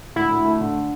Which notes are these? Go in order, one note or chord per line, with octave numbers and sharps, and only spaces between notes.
D2 E4
D2
A3
D3